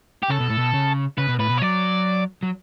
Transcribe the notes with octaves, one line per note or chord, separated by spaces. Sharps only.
G4
C#3 A4
B2
A2
B2
C#3
C#3 B4
B2
A2 B4
B2
C#5
F#3 D5
F#3